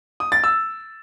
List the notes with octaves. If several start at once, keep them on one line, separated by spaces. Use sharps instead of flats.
D#6
A6
E6